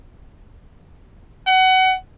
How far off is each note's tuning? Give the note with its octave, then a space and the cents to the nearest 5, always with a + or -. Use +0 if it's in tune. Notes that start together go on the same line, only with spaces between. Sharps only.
F#5 +25